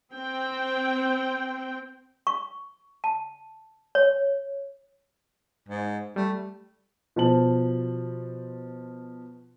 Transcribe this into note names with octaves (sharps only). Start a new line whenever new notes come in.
C4 G5
C#6
A5
C#5
G#2
G3 A3
B2 F3 C5 A5 F#7